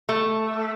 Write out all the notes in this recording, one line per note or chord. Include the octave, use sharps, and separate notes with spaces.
A3